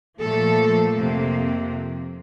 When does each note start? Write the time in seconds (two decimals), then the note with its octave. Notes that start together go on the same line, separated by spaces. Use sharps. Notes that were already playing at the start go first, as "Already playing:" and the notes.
0.20 A#2 F3 A3 A4
0.96 F2 C3 F3 A#3